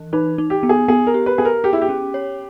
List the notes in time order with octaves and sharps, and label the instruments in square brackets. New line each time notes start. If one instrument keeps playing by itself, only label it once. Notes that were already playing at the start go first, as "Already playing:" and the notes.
Already playing: [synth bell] E3
[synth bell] D#4 [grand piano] B4
[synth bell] D#4
[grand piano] G4
[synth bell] B3
[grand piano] G#4
[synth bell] B3 [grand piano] G#4
[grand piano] A#4
[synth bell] G4
[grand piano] B4
[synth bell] B3 [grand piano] G#4
[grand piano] A#4
[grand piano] G4 [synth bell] G#4
[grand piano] E4
G4
[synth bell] C#4
C#5